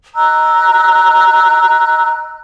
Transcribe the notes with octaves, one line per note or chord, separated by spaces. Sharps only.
D#5 A#5 E6 F#6